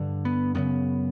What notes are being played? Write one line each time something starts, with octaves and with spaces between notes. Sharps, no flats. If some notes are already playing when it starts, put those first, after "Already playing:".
Already playing: G2 D3
B3
F#2 C#3 B3